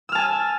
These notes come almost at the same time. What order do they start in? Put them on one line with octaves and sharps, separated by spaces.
E6 F6 A5 G#5